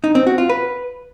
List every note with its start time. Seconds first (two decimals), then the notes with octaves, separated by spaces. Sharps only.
0.04 D#4
0.15 C4
0.27 F#4
0.38 F4
0.49 B4